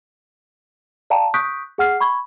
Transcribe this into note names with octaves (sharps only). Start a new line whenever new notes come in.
D5 F5 G5 A5 A#5
C#6 D#6 F#6 G6 B6 D7
G#4 F#5 F6 C7
B5 C#6 G#6